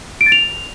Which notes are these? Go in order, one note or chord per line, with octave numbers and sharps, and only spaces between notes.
D7
A6
F7